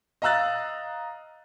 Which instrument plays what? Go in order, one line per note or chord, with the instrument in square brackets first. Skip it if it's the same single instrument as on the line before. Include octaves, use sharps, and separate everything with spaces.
[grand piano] D#5 F5 A#5 E6 F#6 A6